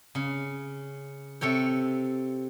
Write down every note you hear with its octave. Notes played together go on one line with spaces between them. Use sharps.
C#3
C3 A4 C#5 G5